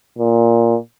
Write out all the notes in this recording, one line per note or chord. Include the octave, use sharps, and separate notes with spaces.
A#2